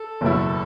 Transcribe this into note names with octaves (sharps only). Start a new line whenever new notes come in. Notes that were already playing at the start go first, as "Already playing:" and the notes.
Already playing: A4
F#1 E2 B2 A3 E4